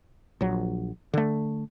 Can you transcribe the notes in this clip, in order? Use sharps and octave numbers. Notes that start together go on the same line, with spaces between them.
A#1 F#3
D3 A3